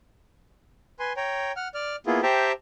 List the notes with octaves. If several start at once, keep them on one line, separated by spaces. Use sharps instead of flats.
B4 G#5 C6
C#5 G5 A#5
F#5 F6
D5 F6
A#3 B3 E4 F4 G#4
G4 C5 E5 G5 A5 A#5